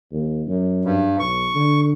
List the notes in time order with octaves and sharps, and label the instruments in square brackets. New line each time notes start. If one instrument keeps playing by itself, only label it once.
[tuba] D#2
F#2
[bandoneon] G2
[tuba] B1 [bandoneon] C#6
[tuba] D3